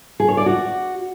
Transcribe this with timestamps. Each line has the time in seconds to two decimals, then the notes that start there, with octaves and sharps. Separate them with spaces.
0.20 G#4
0.28 C#5
0.37 D5
0.46 F#4